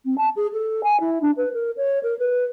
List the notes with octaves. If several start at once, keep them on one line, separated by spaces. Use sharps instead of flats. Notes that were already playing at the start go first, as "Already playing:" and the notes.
C4
A5
G#4
A4
G#5
E4
D4
B4
A#4
C#5
A#4
B4